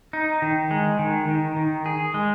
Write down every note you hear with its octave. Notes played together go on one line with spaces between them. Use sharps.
D#4
D#3
G#3
D#3
D#3
D#3
G#4
G#3